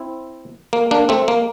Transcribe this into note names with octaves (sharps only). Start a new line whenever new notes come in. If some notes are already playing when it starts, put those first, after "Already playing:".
Already playing: C4 E4
A#3
A#3 D4
A3 C4
A#3